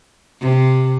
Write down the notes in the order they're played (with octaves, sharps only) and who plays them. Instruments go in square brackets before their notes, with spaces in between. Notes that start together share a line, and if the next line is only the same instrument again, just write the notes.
[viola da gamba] C3